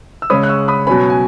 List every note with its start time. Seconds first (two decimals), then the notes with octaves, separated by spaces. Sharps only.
0.22 E6
0.30 C#3 G#3 C#4 B5 D#6
0.43 F#6
0.49 C#6 E6
0.68 B5 D#6
0.87 B2 F#3 C#4 G#5 B5
1.10 G#5